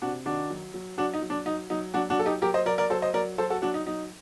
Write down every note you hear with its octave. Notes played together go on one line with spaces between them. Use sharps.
C3 D4 F#4
D#3 D4 F#4
F#3
F#3
F#3 D4 F#4
D#4
F#3
D4
F#3 D#4
F#3 D#4
F#3 D4 F#4
D4 F#4
F#3 A4
D#4 G4
F#3 G4 A#4
C5 D#5
F#3 A#4 D5
A#4 D5
F#3 A4 C5
C5 D#5
F#3 A#4 D5
F#3 A4 C5
F#4 A4
F#3 D4 F#4
D#4
F#3 D#4